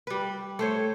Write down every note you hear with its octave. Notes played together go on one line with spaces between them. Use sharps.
G3 B4
A3 C5 C#5